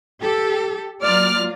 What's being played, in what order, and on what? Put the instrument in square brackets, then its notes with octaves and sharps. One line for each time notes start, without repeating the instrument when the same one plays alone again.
[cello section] G4 A4
[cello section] F#3 A#3 F4 [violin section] D5 F6